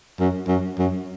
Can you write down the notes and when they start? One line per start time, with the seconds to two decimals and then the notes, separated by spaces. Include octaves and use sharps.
0.20 F#2
0.48 F#2
0.79 F#2